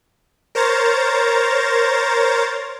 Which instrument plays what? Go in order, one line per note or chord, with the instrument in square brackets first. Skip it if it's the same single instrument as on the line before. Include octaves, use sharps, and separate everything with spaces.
[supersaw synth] A#4 C5 C#5 A#5 A6